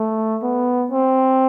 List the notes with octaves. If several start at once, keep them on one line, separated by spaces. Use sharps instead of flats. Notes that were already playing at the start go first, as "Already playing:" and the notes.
Already playing: A3
B3
C4